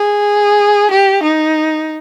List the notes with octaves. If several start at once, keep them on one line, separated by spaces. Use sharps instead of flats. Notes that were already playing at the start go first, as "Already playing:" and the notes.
Already playing: G#4
G4
D#4